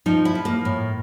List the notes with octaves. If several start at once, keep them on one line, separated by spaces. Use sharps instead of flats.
F3 D#4
E4
F3
A#3
A2